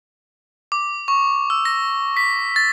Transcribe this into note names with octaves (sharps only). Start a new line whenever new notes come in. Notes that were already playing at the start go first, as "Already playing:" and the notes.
D6
C#6
E6
A#6
B6
A6